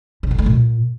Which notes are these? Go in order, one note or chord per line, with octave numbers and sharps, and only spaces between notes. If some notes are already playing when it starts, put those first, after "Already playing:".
C#3
D3
A3
A#2